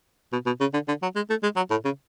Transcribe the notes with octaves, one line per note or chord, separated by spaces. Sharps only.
B2
B2
C#3
D3
D3
F#3
G#3
A3
G#3
F#3
A2
C#3